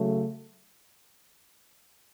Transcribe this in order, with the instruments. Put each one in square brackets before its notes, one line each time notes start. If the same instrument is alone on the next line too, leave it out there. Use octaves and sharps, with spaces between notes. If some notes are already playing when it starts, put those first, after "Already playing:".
Already playing: [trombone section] C#3 F#3 A3